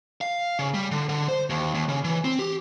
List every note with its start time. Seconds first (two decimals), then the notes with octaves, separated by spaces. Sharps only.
0.21 F5
0.59 C#3
0.74 G3
0.91 D3
1.09 D3
1.28 C5
1.50 D#2
1.74 D#2
1.89 C#3
2.04 E3
2.24 C4
2.39 G4